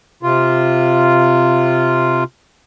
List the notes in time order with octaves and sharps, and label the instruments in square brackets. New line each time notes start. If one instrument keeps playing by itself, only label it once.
[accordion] C3 F4